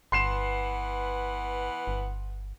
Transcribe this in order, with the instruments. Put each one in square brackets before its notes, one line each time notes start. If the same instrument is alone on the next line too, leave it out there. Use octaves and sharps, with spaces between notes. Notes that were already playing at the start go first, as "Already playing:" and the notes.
[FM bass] G1 [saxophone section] E3 B3 F#5 [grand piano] C6 C7 E7
[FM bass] G1